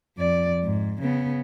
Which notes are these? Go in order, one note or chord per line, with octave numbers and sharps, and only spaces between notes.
F2 D5
G#2
C#3 B3